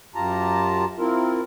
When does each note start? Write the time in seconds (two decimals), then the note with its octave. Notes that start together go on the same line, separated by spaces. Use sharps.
0.15 F#2 F4 G4 A5 A#5
0.99 C4 E4 F4 A#4